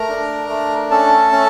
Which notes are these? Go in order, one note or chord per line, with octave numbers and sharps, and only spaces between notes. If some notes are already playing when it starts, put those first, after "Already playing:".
Already playing: A3 A#4 A#5
D4
A3
C#4 A4 A5
C#4